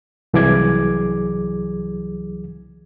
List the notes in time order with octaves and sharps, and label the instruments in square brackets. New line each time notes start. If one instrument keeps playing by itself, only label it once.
[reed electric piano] C2 E3 F#3 G#4 D6 G#6